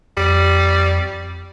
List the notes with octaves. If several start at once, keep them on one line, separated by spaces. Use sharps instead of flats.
F2 G3